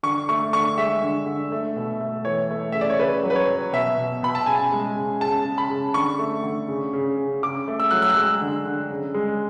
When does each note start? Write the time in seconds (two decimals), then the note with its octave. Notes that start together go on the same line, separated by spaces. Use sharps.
0.03 D3 C#6
0.29 A3 C#6
0.53 D3 C#6
0.77 G#3 E5
1.02 D3
1.26 D3
1.52 A3
1.76 B2
2.01 A3
2.25 E3 C#5
2.51 A3
2.72 C#3 E5
2.81 D5
2.90 C#5
2.99 C#3 B4
3.23 F#3
3.30 B4
3.36 C#5
3.49 F#3
3.73 B2 E5
3.97 B2
4.23 B2 B5
4.35 A5
4.46 C#3 G#5
4.72 G#3
4.96 C#3
5.21 C#3 A5
5.45 C#3
5.58 B5
5.70 C#3
5.94 D3 C#6
6.19 A3
6.43 D3
6.68 C#3
6.93 C#3
7.17 C#3
7.43 C#3 D6
7.68 A3
7.80 E6
7.91 F#3 F#6
8.02 E6
8.09 F#6
8.16 G#3 E6
8.42 D3
8.66 D3
8.91 C#3
9.14 G#3